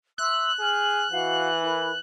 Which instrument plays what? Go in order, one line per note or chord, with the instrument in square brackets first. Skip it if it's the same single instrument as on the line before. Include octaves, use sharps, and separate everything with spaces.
[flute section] E5 C6 E6 [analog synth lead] F#6
[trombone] G#4 [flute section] F6
[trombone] E3 [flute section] F#4 F5 F#5
[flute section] E4 A#4 B5